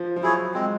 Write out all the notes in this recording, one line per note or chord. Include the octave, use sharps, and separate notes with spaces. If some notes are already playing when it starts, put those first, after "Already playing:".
Already playing: F3
F3
F#3 E4 G#4 C#5
G#3 C4